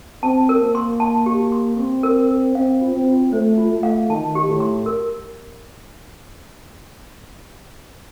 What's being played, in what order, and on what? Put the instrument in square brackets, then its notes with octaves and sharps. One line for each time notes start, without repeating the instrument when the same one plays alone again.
[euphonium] C4 [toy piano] A5
[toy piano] A#4
[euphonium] A#3
[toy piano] C6
A5
G4
C6
[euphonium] C4 [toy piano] C6
[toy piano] A#4
A#4
[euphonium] C4 [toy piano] F5
[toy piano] F4
[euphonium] C4
[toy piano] F4
[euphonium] A3 [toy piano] C5
[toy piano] F4
[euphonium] A3
[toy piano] F5
[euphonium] D#3 [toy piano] A5
[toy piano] G4
[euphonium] A2
[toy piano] C6
A#4